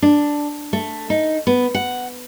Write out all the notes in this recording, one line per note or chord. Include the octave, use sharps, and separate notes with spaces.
D4
A3
D#4
B3
F#5